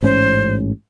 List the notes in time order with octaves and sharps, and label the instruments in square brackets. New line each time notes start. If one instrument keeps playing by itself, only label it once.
[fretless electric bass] A1 G#2 C#4 [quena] C5